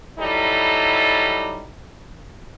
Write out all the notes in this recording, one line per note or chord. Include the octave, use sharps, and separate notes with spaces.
F#3 G3 D#4 E4 A4